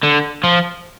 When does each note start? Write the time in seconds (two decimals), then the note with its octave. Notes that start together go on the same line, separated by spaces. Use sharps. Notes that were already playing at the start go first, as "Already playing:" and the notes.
0.03 D3
0.44 F3